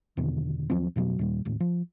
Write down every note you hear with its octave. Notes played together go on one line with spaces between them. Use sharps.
E2 B2 D3 D#3
D#2 F3 F#3 C4
F2 B2 F#3
D#2 A#2 G3
D#1 G#1 A2
F3